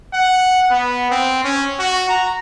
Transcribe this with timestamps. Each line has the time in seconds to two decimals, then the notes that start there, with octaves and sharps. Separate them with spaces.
0.13 F#5
0.71 B3
1.11 C4
1.44 C#4
1.79 F#4
2.09 A#5